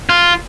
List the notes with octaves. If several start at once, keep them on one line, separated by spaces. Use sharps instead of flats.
F4